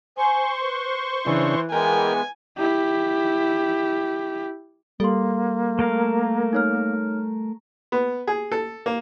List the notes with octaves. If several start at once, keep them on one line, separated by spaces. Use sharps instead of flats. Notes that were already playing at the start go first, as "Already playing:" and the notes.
C5 G#5 C6 C#6
B4
C#3 E3 D4 B4
E3 G#3 B3 A#4 G5 G#5
E4 G4
G3 A#3 A4 C6
A3 A#4 F5
D#4 C#5 F6
B3
G#4
A4
A#3